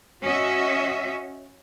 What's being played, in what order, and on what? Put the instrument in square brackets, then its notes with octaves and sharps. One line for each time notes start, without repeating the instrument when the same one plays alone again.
[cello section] C#4 F#4 D#5 E5